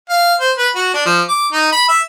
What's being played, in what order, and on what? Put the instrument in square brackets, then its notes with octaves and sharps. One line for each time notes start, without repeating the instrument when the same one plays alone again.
[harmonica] F5
C5
B4
F#4
D4
F3
D6
D#4
B5
E5